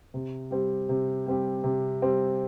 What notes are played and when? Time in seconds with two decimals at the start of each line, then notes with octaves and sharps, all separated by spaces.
0.14 C3
0.51 G3 C4 G4
0.89 C3
1.26 G3 C4 G4
1.64 C3
2.02 G3 C4 G4